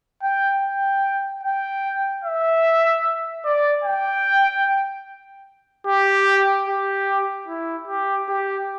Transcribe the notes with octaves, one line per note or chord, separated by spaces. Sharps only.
G5
G5
G5
E5
D5
G5
G4
G4
E4
G4
G4